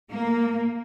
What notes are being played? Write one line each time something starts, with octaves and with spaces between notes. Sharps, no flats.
A#3